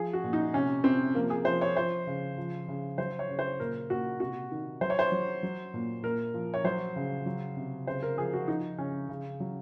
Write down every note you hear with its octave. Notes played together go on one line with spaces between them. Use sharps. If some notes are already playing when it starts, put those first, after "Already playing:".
Already playing: F3 G#4
F#4
A#2
D#4
C3 C#4
C3 C4
F3 A#3
G#4
F3 C5
C#5
F3 C5
C#3
F3
C#3
F#3 C5
C#5
C#3
C5
A#2 A#4
A#2 F#4
C3 F#4
D#3
F#3 C5
C#5
C5
F#3
F#3
A#2
A#2 A#4
F3
C#5
F#3 C5
C#3
F#3
C3
C#3 C5
A#4
F3 G#4
F#4
F3 D#4
C#3 C#4
C#3
F#3